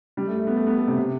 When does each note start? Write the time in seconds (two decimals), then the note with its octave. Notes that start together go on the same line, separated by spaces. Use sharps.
0.17 G3
0.27 A3
0.37 A3
0.47 B3
0.57 A3
0.67 B3
0.78 A3
0.87 C3
0.98 C3